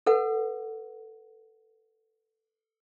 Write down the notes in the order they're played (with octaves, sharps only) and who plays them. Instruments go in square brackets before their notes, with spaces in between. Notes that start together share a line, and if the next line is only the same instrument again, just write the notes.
[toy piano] A4 B4 F#5